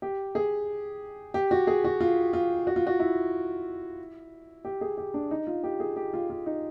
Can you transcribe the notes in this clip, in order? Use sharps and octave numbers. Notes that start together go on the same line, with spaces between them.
G4
G#4
G4
F#4
G#4
F#4
F4
F4
F#4
F4
F#4
E4
G4
G#4
G4
D4
D#4
F4
G4
G#4
G4
F4
F4
D#4